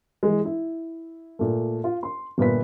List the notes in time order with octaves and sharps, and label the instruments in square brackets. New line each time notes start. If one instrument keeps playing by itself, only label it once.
[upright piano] E3 G#3
E4
A#2 A3
F4
C6
G1 A#2 F4 B4 B6